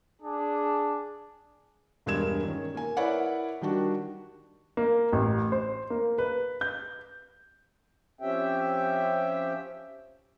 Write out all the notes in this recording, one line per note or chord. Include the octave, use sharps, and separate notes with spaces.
D4 G#4
E1 G2 G#3 A#4 G#6 E7
D#3 C#4
A#3 G#5
E4 A#4 B4 C#5 D5 F#5
D#3 G3 D4 F#4
A#3
A1
C5
A#3
B4
G6
F3 C4 C#4 G4 E5 G5